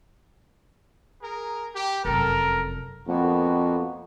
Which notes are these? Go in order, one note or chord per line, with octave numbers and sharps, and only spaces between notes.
G#4 A#4
G4
F1 F#2 A4 A#4
F2 A#3 B3 F#4